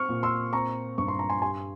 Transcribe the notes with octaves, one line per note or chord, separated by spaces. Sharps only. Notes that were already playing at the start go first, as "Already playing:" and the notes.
Already playing: C4 C#6 F6
A#2
C6 E6
C4 A#5 C#6
G2 C#6
C6
A#5
G#5 C6
G3 G#5 C6